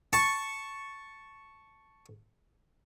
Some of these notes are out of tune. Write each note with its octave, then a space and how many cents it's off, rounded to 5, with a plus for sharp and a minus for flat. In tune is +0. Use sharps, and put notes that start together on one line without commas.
A5 +0 C#6 +0